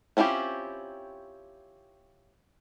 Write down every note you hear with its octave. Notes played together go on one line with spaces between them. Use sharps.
C4 C#4 E4 F4 G4